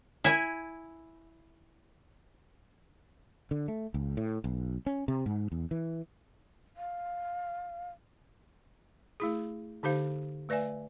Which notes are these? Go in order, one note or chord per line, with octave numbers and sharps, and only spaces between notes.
E4 G#5
D3
A3
C#2
A2
B1
C#4
C3
G#2
E2
E3
F5
A3 E4 G#4
D3 D#4 G4 C5 F5
A3 B4 D5 E5 G#5